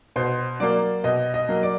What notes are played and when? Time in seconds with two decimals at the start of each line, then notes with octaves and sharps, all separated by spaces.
0.16 B2 C5
0.60 F#3 A#3 D5
1.04 B2 D#5
1.34 D#5
1.49 F#3 A#3
1.63 D5